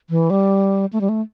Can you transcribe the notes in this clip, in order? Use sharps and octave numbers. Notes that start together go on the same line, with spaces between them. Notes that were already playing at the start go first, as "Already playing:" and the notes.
E3
G3
A3
G3
A3